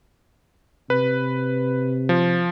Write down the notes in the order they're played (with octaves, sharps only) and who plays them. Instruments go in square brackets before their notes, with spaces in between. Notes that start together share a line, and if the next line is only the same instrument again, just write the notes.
[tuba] C3 [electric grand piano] B4
[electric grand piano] F3